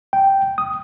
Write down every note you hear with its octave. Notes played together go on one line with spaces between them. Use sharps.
G5
D#6